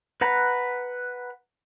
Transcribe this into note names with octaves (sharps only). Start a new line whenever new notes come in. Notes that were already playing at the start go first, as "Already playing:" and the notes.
B4 F#5 A#5 B5